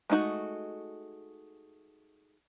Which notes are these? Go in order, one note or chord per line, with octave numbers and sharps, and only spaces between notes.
G#3 A3 D#4 E4 F#4